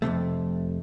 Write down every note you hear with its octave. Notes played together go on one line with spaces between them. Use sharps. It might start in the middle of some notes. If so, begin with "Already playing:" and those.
F2 A2 C3 A3